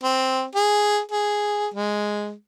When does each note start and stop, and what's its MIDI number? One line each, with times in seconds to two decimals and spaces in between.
0.03 0.44 60
0.55 1.00 68
1.12 1.67 68
1.74 2.32 56